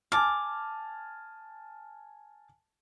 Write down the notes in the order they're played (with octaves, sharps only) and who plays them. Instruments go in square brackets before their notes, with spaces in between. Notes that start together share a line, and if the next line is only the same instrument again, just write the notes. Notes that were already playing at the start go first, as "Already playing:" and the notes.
[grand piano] G#5 A5 F6 [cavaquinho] D6